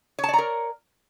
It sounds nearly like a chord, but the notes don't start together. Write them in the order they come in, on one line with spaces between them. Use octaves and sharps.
C#5 A5 D5 A#5 A#4